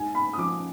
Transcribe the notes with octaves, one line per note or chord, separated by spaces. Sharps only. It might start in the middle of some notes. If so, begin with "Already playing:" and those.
Already playing: G#2 G#5
B5
D#6
F3 D6